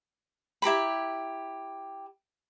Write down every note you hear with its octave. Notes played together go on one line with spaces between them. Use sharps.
E4 G4 A#5 B5